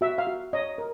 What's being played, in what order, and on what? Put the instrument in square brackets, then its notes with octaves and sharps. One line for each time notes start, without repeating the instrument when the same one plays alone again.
[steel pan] F#4 E5
F5
F#4
C#5 D#5
A#4